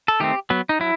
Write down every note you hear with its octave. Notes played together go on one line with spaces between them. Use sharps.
A4
D#3 A3 C4 G4
F#3 B3
D#4
F#3 E4